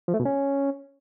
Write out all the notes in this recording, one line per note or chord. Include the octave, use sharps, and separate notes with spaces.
F3
A3
B2
C#4